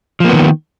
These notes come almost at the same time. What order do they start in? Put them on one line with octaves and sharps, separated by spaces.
F3 A#3 B3 D#3